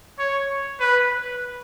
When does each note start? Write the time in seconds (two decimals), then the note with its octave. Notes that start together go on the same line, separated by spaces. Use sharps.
0.19 C#5
0.80 B4